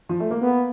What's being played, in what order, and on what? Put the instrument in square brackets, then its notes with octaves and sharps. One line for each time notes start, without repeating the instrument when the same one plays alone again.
[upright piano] F3
A3
A#3
[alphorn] B3